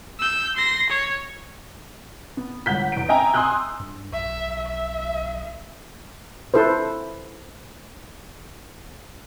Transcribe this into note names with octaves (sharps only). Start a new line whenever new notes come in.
E6 G6
C6 A#6
C#5
B3
G1 G#2 F#5 G6 B6
E2 D7
D#5 E5 G5 G#5 A#5
G#5 C6 D#6 E6 F#6 G6
G2
B1 E5
E5
E4 A4 B4 C5